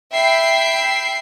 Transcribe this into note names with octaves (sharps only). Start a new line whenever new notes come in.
E5 G5 B5 C7